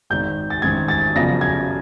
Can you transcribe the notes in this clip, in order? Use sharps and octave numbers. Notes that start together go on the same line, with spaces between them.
G#1 G#2 D#3 G6
A6
A1 G#2 D#3 G#6
A6
G1 F#2 C#3 F3 A#6
G#6